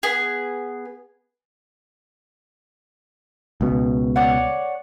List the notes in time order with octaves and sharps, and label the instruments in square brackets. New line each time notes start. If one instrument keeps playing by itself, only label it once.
[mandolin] B3 G#4
[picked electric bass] C#2 B2
[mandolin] C#5 D5 F#5